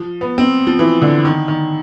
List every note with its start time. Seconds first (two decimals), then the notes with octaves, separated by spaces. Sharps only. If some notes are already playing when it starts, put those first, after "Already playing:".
Already playing: F3
0.21 B3
0.38 C4
0.67 F3
0.79 E3
1.02 D3
1.25 D#3
1.48 D#3